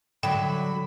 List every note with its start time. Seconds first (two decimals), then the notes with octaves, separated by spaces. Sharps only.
0.23 D3 F#3 G5 B5